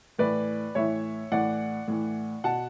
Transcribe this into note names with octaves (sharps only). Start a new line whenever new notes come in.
A2 E3 B4 D5
A2 E3 C#5 E5
A2 E3 D5 F#5
A2 E3
B2 F#5 A5